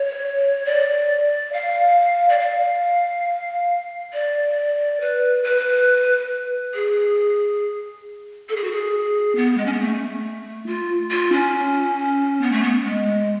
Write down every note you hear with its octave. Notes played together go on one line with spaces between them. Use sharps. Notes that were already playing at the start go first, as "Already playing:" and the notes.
Already playing: C#5
D5
F5
D5
F5
D5
B4
B4
G#4
A4
G#4
F#4
G#4
B3
G#3
C#4
B3
A3
F4
F4
C#4
B3
A3
B3
G#3